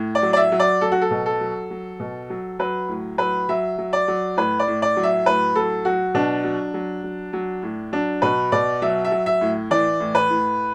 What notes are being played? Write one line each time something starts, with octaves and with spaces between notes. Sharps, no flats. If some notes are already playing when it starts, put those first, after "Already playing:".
Already playing: A2
D5
F#3
D5
E5
F#3
D5
F#3 A4
F#4
A4
B2
A4
F#3
F#3
B2
F#3
F#3 B4
A2
F#3 B4
F#3 E5
F#3
D5
F#3
A2 B4
D5
A2
D5
F#3
E5
A2 B4
F#3 A4
F#3 F#4
B2 D4
F#3
F#3
F#3
F#3
A2
F#3 D4
B2 B4
B2 D5
F#3 E5
E5
F#3
E5
A2
E3 D5
A2
B4
A2